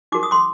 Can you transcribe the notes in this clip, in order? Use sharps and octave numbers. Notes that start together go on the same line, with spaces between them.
D#4 F#4 A#4 D6
D#6
C6 D6